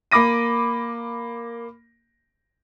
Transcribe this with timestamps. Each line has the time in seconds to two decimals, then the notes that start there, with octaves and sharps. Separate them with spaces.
0.12 A#3 B5 D6 A#6 D#7